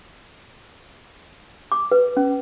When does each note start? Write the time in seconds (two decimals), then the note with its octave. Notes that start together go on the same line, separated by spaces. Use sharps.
1.72 D6
1.91 B4
2.17 C#4